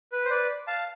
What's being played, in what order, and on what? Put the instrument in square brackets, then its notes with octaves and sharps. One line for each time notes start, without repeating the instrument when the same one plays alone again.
[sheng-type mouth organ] B4
C5
B4 D5
F5 A5